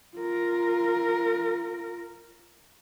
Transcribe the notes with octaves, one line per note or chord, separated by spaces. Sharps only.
F4 A#4